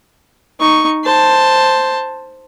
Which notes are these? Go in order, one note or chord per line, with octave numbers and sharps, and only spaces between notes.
D#4 C#6
C5 A5